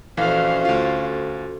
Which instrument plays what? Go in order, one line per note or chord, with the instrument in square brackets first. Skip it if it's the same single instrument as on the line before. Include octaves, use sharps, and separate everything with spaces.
[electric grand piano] A#1 E3 [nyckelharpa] C#4 C5 [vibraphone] F#4 A4 [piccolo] F5
[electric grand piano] D2 F4